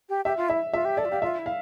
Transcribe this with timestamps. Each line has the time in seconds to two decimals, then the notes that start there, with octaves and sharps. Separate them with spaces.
0.09 G4
0.25 G4 E5
0.37 F4
0.49 E4 E5
0.73 F4 E5
0.85 G4
0.97 A4 D5
1.05 F4
1.10 G4 F5
1.22 F4 E5
1.39 E4
1.46 F5